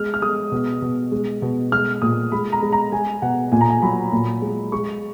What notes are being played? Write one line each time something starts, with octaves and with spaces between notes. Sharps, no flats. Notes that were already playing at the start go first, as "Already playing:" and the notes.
Already playing: G#3 F6
F6
G#3 D#6
B2
B2
G#3
B2
G#3 F6
A#2 D#6
G#3 B5
A#5
G#3
A#5
G#3 G#5
B2 F#5
A#2 G#5
A#5
G#5
F#3 B5
A#2
G#3
G#3 C#6